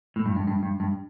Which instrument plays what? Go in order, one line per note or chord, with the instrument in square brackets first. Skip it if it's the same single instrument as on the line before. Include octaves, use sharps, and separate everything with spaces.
[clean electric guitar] A2
G2
G2
G2
G2
G2